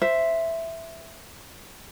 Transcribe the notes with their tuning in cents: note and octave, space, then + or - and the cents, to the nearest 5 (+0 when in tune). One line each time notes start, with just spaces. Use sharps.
C5 +0 E5 +0